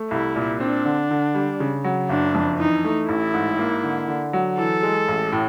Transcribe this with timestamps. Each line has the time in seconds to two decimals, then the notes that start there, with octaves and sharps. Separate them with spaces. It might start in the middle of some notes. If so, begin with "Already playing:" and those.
Already playing: A3
0.11 C2 E4
0.36 A#2
0.60 C4 D4
0.85 D3
1.11 D3
1.34 G3
1.60 C#3
1.84 F#3
2.10 F#1 D4
2.35 F2
2.59 E3 D#4
2.85 A3
3.09 A1 E4
3.34 G#2
3.59 A#3
3.84 D3
4.08 D3
4.33 F#3
4.58 E3 A4
4.83 G#3
5.08 A1
5.32 A2